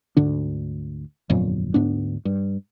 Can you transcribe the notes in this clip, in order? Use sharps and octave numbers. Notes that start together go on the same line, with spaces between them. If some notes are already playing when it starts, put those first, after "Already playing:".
D2 G#2 D3 D4
G1 F2 A#2 F#3
D2 G#2 B3 D4
G2